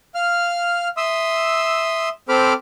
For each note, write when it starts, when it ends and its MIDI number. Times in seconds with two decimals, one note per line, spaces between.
0.15 0.88 77
0.15 0.88 89
0.97 2.09 76
0.97 2.09 84
0.97 2.09 87
0.97 2.09 88
2.29 2.53 60
2.29 2.53 69
2.29 2.53 72
2.29 2.53 83
2.29 2.53 86
2.29 2.53 89